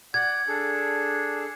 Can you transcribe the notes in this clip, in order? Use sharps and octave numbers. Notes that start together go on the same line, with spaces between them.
D5 F#5 G#6
D4 G#4 A4